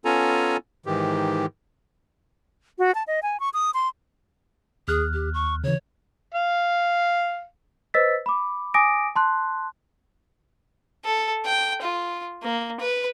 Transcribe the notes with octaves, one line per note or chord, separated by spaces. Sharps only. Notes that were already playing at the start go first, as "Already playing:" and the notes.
B3 C#4 F4 A4 G#5 A#5
G#2 D#3 E3 G4
F#4
A5
D#5
G#5
C#6
D#6
C6
D#2 G#4 F6 F#6
G4
C#6
C#3 E3 C#5
F5
B4 C5 D#5 E6 A6 B6
B5 D6
G#5 D6 D#6 A#6 D7
A5 C6 F#6
A4
G5
F4
A#3
B4